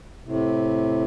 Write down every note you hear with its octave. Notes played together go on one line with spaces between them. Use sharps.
A2 C3